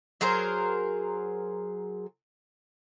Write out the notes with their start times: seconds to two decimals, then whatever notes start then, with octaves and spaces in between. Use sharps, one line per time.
0.21 F#3 G#4 A#4 C5